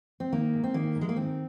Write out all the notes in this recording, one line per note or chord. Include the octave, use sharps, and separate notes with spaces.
C4
D#3 A#3
G#2
C4
D#3 A#3
G#2
G#3
A#3
D#3 C4